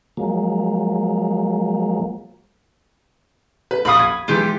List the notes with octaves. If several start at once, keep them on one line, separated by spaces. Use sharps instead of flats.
F3 F#3 G#3 A#3
B4
A#1 F5 B5 D#6
G#6
E3 G#3 F4 G4